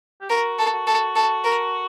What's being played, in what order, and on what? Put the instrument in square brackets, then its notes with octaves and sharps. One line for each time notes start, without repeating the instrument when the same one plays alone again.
[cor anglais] G4
[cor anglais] F#4 [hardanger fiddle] A#4
[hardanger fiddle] A4
[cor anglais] F#4
[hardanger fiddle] A4
A4
A#4